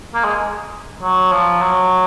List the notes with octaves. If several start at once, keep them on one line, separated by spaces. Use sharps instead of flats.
A#3
G#3
F#3
F3
F#3